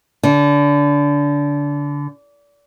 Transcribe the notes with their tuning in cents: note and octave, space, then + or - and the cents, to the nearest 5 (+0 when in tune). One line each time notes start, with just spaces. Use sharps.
D3 -25